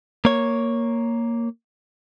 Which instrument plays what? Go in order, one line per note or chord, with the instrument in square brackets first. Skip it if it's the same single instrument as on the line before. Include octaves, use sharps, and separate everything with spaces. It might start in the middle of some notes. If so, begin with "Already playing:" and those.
[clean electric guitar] A#3 C#5